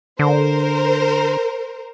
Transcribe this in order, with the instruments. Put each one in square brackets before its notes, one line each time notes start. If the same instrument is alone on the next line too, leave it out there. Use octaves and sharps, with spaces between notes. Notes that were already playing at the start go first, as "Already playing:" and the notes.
[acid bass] D3 [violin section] A#4 C5